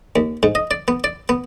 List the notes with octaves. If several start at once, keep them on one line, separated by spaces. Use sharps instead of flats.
D#2
G#2
D#5
D5
B3
D5
B3